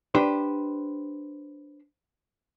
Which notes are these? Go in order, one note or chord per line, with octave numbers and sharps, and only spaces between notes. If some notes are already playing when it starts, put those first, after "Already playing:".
D4 G4 B4 C5